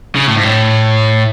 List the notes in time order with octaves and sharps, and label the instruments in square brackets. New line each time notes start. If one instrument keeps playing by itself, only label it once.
[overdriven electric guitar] C#3
A2
G#2
A2